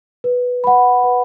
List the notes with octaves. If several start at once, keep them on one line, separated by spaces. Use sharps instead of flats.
B4
F#5 B5
B4